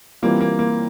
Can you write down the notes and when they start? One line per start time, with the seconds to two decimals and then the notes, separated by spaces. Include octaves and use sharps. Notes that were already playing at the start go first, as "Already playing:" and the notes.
0.22 E3 G3 A#3 C4 F4
0.41 A#3
0.59 A#3